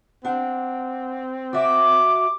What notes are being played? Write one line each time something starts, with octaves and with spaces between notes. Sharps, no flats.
C4 D4 F#5
F#4 E5 D6